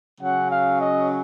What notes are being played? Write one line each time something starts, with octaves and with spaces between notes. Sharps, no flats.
C#3 F#3 C#4 F#5
F5
D#5